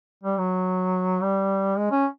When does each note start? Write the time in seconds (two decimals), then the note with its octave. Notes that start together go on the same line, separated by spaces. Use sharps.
0.23 G3
0.38 F#3
1.22 G3
1.77 G#3
1.92 C#4